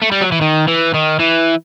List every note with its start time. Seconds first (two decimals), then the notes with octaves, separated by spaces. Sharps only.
0.02 A3
0.11 G3
0.21 F#3
0.32 E3
0.41 D#3
0.67 E3
0.94 D#3
1.19 E3